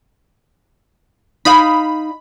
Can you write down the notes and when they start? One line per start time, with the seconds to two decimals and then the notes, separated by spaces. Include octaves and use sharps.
1.45 D#4 D#5 F5 B5